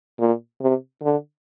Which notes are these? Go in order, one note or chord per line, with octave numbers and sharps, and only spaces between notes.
A#2
C3
D3